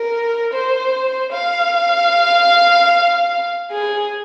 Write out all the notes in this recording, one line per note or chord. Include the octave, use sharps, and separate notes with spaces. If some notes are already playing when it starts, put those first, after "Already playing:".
Already playing: A#4
C5
F5
G#4